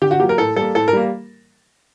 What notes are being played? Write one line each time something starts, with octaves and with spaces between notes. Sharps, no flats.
D3 G4
F#4
F#3 A#3 G4
A#4
A2 A4
G3 A#3 A4
A2 A4
A#4
G3 A#3